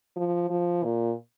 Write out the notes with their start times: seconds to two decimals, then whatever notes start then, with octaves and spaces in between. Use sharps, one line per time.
0.16 F3
0.50 F3
0.83 A#2